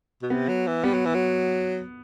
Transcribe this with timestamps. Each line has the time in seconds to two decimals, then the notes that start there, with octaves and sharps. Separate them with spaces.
0.22 B2
0.30 C3 B3
0.49 F#3
0.67 E3
0.84 G3 B3
0.94 F#3
1.05 E3
1.15 F#3